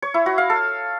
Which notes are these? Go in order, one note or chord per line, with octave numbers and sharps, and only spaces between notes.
C#5
E4
F#4
F5
A4